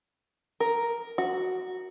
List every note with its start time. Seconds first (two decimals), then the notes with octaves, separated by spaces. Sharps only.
0.60 A#4
1.18 F#4